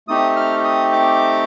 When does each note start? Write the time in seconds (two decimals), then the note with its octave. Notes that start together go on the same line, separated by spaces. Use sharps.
0.08 A3 C4 D#4 G4 D#6
0.36 F6
0.64 D#6
0.92 D6